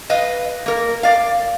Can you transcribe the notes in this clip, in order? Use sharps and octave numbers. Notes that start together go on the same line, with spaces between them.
B4 D#5 F5
A#3 A#4
D5 F5